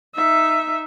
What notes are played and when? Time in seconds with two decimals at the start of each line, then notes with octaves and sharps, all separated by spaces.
0.15 D#4 E5